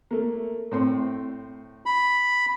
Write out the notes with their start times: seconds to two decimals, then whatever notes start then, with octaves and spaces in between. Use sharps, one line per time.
0.11 A3 A#3
0.71 A2 C4 C6
1.86 B5